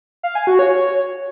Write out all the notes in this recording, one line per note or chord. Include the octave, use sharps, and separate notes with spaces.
F5
G#5
F#4
C#5